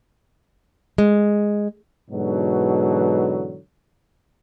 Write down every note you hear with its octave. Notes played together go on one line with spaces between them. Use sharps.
G#3
G#2 B2 D3 E3 F#3